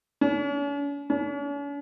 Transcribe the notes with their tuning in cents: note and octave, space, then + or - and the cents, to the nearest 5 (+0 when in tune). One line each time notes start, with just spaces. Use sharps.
C#4 +45
C#4 +45